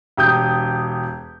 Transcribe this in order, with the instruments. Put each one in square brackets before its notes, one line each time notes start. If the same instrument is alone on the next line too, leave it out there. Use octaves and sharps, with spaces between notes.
[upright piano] E1 G4 D#6 G6